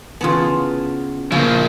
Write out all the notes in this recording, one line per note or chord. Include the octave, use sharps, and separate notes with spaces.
C#3 E3 B3 F4 A5
C#3 F3 A3 A#3 E4